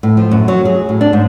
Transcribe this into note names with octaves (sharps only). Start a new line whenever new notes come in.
A2
F3
F#2
F#3
G#4
A2
D4
G#2